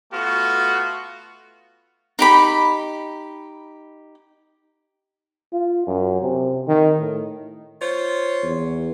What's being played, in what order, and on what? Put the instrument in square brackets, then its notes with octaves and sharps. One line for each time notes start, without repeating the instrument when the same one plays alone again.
[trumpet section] A3 B3 F4 F#4
[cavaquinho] D#4 G4 B5
[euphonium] F4
F#2
C3
D#3
A2
[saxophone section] F4 C5 C#5
[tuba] E2